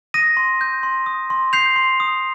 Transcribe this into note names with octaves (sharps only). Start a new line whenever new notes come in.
D#6 A#6 D#7
C6
G6
C6
D#6
C6
G6 C7 F7
C6
D#6